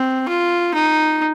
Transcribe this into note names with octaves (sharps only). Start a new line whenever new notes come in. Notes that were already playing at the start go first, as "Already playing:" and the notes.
Already playing: C4
F4
D#4